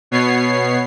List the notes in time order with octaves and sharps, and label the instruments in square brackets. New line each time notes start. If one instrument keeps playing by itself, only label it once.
[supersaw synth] B2 B3 C#5 C7